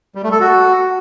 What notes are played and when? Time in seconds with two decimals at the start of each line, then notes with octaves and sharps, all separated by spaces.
0.15 G3
0.24 A3
0.32 A4
0.40 F#4